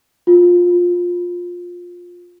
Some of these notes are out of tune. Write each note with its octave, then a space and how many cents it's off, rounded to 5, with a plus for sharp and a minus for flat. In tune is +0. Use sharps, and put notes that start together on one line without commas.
F4 +15